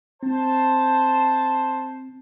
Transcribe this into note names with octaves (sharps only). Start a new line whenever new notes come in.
C4 C5 A5